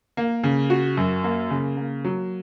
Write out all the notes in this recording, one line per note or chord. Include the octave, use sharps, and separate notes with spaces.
A#3
C#3
F#4
F#2
A#3
C#3
A#3
F#3